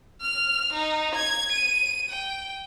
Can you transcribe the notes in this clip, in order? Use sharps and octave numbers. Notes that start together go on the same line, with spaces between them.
F6
D#4
G#6
D#7
G5